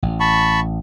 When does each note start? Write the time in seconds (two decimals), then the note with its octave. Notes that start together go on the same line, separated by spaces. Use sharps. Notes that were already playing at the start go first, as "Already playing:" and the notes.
0.03 A1
0.20 A5 B5 C#6